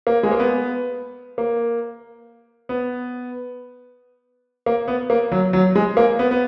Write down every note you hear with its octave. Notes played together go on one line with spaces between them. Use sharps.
A#3
G#3
A#3
B3
A#3
B3
A#3
B3
A#3
F#3
F#3
G#3
A#3
B3
B3